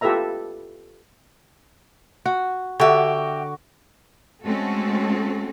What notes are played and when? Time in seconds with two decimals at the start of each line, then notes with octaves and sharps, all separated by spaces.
0.01 F4 G4 A4 B4 E5 A#5
2.26 F#4
2.80 D3 F#4 G4 E5 D6
4.43 G#3 A3 C4 C#4 F#4 A4